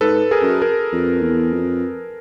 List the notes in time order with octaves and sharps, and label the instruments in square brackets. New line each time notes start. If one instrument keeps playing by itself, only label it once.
[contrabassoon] G#2 [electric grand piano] A4 B4
[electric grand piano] G#4 A#4
[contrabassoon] F#2
[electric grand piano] G#4 A#4
[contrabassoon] F2
E2
F2